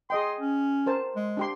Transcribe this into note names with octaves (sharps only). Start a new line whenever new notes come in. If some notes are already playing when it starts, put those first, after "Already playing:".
G#4 D#5 G5 C6
C#4
A#4 C5 A5
G#3
D4 G4 C6